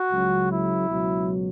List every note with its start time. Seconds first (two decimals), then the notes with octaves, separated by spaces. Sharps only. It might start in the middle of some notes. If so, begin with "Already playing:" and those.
Already playing: F#4
0.11 C#2 C#3 F#3
0.50 E4
0.90 C#2 B2 F#3